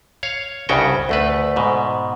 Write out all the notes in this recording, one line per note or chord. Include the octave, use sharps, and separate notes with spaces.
C#5 F5
C2 G2 C#3 C#4 F#4 G5
D2 A3 B4
G#2 B2